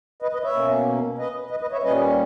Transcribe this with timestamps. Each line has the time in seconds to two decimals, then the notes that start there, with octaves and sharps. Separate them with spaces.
0.22 B4 D#5
0.33 B4 D#5
0.44 C#5 E5
0.54 B2 A#3 C#4
1.19 B4 D#5
1.51 B4 D#5
1.61 B4 D#5
1.72 C#5 E5
1.83 A#2 G3 C#4 B4 D#5